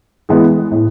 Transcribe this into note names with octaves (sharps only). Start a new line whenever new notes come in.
E3 G#3 B3
A2